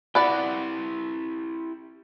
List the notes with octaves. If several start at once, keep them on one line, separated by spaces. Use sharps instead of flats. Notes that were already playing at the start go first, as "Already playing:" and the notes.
E4 G4 B4 D5 F#5